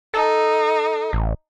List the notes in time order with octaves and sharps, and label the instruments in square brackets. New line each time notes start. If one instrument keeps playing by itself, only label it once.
[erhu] D#4 [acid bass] A4
[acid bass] A1